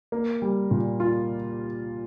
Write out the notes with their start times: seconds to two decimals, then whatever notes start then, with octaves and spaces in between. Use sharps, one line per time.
0.12 A#3
0.42 G3
0.71 A#2
1.00 F4